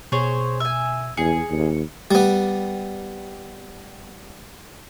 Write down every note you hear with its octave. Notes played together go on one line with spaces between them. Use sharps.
B2 G#4 C5 C#5
E5 G#5
E2 G#4 C#7
D#2
G3 B3